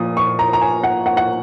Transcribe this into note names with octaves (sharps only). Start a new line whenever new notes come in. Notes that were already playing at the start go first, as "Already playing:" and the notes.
Already playing: A#2 F3 D#6
C#6
A#5
A#5
G#5
F#5
F#5
F#5